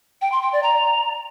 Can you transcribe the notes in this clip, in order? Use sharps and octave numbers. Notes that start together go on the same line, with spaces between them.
G5
C6
G5
D5
A#5